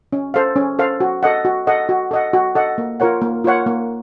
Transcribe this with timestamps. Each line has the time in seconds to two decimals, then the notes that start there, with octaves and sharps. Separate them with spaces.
0.13 C#4
0.34 A4 C5 F5
0.56 C#4
0.79 A4 C5 F5
1.00 F#4
1.23 A4 D#5 F#5
1.45 F#4
1.67 A4 D#5 F#5
1.89 F#4
2.11 A4 D#5 F#5
2.33 F#4
2.55 A4 D#5 F#5
2.78 A#3
3.00 F4 A#4 C#5 F#5
3.22 A#3
3.44 F4 A#4 C#5 F#5
3.66 A#3